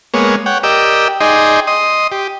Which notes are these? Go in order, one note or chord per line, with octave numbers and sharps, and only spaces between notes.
G#3 A#3 B3 C#5
C#5 F#5 G5
G4 A#4 D5 D#5 G5 E6
D#4 G#4 D5 D#5 G5 C6
D#5 C6 D#6
G4